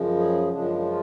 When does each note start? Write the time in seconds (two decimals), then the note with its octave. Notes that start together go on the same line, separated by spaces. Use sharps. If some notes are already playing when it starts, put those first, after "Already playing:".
Already playing: F#2 C#3 F3 G#3
0.18 G#4
0.51 F#2 C#3 F3 G#3 D4
0.79 D4
0.85 F4